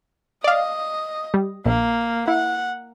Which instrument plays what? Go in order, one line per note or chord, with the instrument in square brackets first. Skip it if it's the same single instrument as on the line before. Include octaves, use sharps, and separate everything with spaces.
[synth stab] D5 F5 [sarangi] D#5
[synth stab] G3
[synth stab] A#1 [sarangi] A#3
[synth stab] E4 [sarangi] F#5